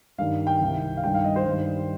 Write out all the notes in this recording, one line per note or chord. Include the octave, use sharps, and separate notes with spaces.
G2 D#3 G3 F5
G5
C2 C3 D#3
F5
G2 D#3 G3 G5
F5
D#5
C5
G2 D#3 G3